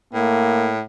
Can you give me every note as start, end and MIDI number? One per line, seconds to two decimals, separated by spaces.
0.14 0.82 45
0.14 0.73 58